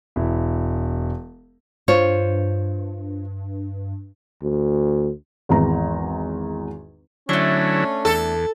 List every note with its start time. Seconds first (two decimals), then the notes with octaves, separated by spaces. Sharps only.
0.16 E1 E4
1.88 G2 F4 C5 C#5
4.43 D2
5.49 G#1 E2 A#5
7.29 D3 F#3 A3 C#4 D4 E4
8.05 E2 A4